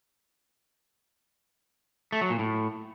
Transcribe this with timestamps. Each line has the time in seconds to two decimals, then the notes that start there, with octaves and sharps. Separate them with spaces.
2.12 A3
2.21 F#3
2.30 A#2
2.39 A2